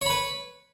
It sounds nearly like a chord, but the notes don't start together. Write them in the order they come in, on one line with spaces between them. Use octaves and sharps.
C#5 B5 B4